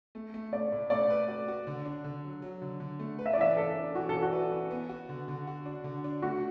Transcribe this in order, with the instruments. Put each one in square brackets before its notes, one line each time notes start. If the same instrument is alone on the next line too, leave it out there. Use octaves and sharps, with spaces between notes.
[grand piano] A3
A3
[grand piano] A3 [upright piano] D5
[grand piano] A2
[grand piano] A3 [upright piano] D5
[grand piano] B4
F#4
F#4
D3
D4
D3
F#3
F#3
D3
D3
A3
B4
[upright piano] E5
D5
[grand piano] E3 [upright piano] E5
[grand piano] E3 [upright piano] A4
[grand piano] D4
[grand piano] E3 [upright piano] F#4
[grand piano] E3 [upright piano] A4
[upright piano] F#4
[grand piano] B4
E3
B3
F#4
D3
D3
F#4
D4
D3
D4
[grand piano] A3 [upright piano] F#4